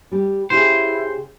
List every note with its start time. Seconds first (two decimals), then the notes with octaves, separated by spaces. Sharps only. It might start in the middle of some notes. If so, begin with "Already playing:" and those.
0.11 G3 G4
0.50 C#3 E4 G4 G#4 C5